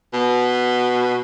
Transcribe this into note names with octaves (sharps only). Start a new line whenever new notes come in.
B2